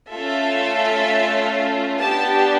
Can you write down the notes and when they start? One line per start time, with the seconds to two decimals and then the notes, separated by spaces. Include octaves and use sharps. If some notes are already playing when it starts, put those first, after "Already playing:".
0.11 A3 C#4 F4 A4 E5
1.99 B3 D4 G4 A5